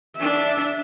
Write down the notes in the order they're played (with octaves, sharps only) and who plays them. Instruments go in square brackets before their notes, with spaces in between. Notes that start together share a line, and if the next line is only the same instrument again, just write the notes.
[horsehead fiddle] D4 E5